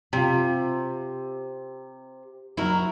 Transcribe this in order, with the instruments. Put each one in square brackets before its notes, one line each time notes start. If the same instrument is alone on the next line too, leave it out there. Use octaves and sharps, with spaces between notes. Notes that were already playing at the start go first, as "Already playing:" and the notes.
[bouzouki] C3 [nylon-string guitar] F4 G4
[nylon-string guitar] F#3 D#4 [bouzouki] E4 F#4 A#4